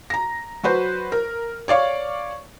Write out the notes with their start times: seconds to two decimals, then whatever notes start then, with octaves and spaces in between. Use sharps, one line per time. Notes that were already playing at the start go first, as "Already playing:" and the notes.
0.10 A#5 A#6
0.63 F#3 F#4 B4 C5
1.12 A#4
1.68 C#5 D5 F5 C#6